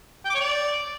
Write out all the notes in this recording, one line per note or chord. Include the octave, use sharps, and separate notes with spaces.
G5
D6
C#5
D5